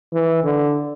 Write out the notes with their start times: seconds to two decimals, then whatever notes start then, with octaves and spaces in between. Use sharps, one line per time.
0.13 E3
0.44 D3